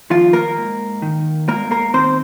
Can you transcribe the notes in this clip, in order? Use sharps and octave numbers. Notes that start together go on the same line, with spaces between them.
D#3 F3 F4
A#3 A#4
G#2
D#3
G#2 A#3 A#4
A#3 A#4
D#3 C4 C5